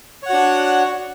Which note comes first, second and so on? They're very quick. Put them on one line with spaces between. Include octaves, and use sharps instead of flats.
C#5 F#5 F#4 D4